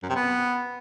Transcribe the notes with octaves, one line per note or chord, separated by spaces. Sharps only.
F#2
C3
B3